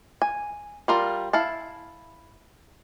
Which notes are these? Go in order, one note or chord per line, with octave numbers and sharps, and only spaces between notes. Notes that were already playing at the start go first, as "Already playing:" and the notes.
G#5
G3 F4 A#4
E4 F5 A5